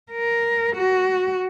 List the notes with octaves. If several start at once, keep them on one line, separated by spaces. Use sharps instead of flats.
A#4
F#4